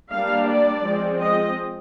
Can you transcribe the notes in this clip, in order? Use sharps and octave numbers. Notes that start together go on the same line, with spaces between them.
G3 A#3 D4 F5
D5
F3 G#3 C4
D#5